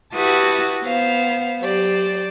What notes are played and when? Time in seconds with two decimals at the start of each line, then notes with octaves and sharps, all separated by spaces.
0.14 E4 F#4 G4 B4 A5 D#6
0.84 B3 C5 F5
1.60 F#3 G4 C5 D5